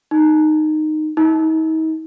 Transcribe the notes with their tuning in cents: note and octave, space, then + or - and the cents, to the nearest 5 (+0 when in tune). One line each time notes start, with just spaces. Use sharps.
D#4 -10
D#4 +40